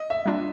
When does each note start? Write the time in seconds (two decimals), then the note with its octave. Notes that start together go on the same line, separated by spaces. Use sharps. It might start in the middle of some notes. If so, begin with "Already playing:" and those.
Already playing: D#5
0.10 E5
0.26 G3 A#3 D4 F4